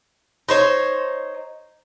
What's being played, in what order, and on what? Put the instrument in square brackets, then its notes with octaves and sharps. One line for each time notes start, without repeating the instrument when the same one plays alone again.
[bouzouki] D#4 C5 C#5